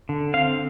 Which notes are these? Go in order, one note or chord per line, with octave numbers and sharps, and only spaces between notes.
D3
C4 F5